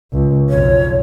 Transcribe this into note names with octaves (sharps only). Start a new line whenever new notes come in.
C#2
B1 F2 C#5